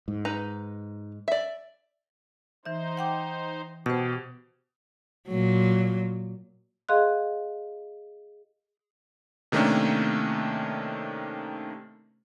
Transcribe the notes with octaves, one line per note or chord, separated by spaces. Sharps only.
G#2
D#4 B4 A#5
D5 E5
E3 D#4 C5 E5
F#5 G5 D6
B2 G4 C5 G6
A#2 F#3
G#4 D#5 F5 C6 F#6
C3 D#3 A3 A#3 C#4 D4